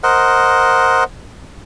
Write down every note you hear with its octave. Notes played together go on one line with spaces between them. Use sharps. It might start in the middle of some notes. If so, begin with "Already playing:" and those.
A#4 C5 D#5 F#5